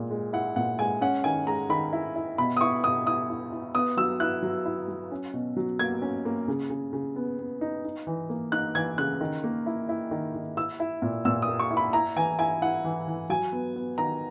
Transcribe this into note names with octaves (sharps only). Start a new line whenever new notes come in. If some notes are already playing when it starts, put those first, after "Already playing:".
Already playing: A#2 G#3
G#3
E4 F#5
A#2 F#5
G#3 G#5
C#4 F#5
D#3 G#5
G#3 A#5
D#3 B5
E4
E4
B2 B5
D#6
E4 C#6
B2 D#6
E4 D#6
E4
E4
B3 D#6
F#3 E6
E4 F#6
F#3
E4
F#3
C#4
B2
F#3
A#3 G#6
C#4
A#3
C#3
C#3
C#3
B3
B3
D#4
D#4
E3
A#3
D#4 F#6
E3 G#6
C#3 F#6
D#3
A#3
E4
E4
D#3
D#3
E4 E6
E4
A#2
A#2 E6
D#6
A#3
C#6
E4
B5
E4 A#5
E3 G#5
E4 G#5
E4 F#5
E3
E3
F#3 G#5
B3
B3
D#3 A#5